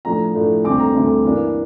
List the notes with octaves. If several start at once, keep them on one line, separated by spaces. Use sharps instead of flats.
A2 F3 A3 D4 A#5
A2 F3 A3 D4
D2 D3 G3 C4 D6
A#5
D2 D3 G3 C4
G2 E3 A#3 D4